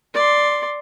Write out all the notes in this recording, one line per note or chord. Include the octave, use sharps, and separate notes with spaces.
D5 C6